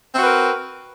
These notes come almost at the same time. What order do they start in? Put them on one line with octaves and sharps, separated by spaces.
C4 F#4 B4 A#4